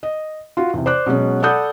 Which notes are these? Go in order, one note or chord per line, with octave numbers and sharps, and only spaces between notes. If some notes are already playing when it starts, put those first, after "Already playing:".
D#5
F4 F#4
E2 C3
C5 D5 D6 F#6
B2 F#3 G#3 C#4
A4 D5 F#5 B5 D#6 G6